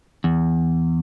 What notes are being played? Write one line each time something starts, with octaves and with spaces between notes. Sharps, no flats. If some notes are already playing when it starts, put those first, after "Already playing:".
E2